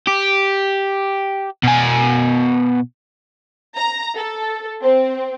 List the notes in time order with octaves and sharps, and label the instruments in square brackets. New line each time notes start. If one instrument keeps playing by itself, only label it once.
[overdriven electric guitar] G4
B2 G#5
[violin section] A#5
A4
C4